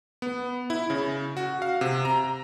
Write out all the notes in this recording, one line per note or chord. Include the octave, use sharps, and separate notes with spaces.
B3
E4
C#3
F#4
F5
C3
A#5